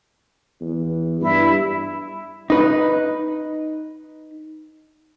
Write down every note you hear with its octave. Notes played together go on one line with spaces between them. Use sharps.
E2
G2 E4
D#4 B4